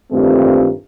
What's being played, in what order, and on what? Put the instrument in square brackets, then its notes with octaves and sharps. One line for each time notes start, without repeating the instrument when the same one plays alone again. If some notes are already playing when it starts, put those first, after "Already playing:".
[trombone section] G2 A#2 D#3 A3 A#3 C4